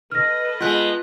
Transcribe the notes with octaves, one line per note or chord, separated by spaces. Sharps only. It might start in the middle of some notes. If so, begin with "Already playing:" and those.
A4 B4 D#5 F6 A#6
G#3 B3 F4 F#6